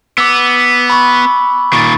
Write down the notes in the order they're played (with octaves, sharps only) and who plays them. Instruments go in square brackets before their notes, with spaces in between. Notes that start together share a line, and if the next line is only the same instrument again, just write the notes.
[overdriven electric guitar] B3 [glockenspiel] D6 E6
[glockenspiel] B5 C#6
[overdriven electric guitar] A#2 D#3 [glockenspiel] C#6 A6